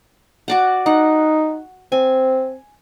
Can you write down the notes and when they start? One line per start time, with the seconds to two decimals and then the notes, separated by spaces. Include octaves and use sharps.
0.48 F#4 D5 F#5
0.86 D#4 F#5
1.92 C4 G#5